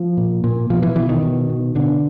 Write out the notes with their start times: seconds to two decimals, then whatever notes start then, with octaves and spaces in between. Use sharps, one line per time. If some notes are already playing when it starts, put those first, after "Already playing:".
Already playing: F3
0.17 A#2
0.44 A#2
0.70 B2 F3
0.83 E3
0.96 B2 E3
1.09 D#3
1.22 B2
1.49 B2
1.75 B2 D3